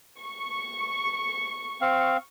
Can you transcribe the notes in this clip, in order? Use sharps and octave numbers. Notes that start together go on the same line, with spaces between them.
C#6
C4 F5